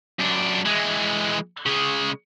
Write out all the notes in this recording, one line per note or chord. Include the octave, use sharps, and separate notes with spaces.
F#2 D4
E3 G#3
C#3 G#3